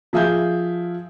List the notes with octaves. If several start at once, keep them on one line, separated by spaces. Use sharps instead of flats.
F3 G#4 E5 F5 G6